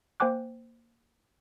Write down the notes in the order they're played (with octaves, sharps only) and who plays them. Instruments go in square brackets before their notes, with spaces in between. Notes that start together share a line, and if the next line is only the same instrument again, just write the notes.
[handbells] A#3 C5 G5 G#5 D6 F#6